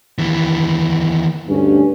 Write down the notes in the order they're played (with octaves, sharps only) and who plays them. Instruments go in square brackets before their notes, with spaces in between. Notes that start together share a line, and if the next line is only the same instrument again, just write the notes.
[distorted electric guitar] D#2 E3
[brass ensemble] D2 G2 C#4